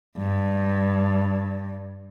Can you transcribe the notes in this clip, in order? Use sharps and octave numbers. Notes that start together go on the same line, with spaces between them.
G2